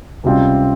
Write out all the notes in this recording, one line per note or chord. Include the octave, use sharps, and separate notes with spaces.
C#2 C3 G3 C4 F4